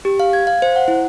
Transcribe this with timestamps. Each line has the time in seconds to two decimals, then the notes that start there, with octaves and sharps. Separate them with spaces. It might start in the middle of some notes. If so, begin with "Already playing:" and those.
0.05 G4
0.20 F5
0.33 G#6
0.47 F5
0.62 C5
0.76 F#5
0.88 E4